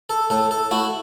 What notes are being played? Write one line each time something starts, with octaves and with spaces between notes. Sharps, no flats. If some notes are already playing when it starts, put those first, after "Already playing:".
A4
A2 A4
A4
A3 E4 F#4